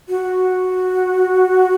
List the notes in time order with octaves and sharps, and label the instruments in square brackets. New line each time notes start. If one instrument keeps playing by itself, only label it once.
[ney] F#4